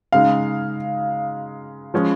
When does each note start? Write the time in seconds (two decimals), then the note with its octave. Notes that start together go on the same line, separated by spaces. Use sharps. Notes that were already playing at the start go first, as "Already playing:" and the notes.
0.12 C#3 G#3 D#4 F5
1.94 F3 G#3 C#4